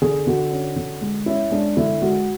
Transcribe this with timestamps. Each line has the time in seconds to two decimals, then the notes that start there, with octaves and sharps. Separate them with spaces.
0.02 D3 G#4
0.27 D3 F#4
0.51 C#4
0.76 D3
1.01 G#3
1.26 C#4 E4
1.51 G#3 D4
1.77 D3 E4
2.02 G#3 F#4